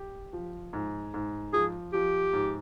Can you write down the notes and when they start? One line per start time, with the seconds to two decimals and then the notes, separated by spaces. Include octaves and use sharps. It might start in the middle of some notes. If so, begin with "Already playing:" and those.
Already playing: G4
0.33 F3
0.73 G#2
1.14 G#2
1.53 F3 G#4
1.93 F3 G4
2.33 G#2